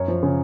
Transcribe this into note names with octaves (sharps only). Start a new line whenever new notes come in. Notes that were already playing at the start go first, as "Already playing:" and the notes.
Already playing: F#2 C#5
F3
C#3